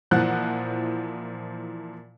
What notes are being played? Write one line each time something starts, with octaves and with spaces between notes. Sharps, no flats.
A#2 E3 F3 F#5 F#6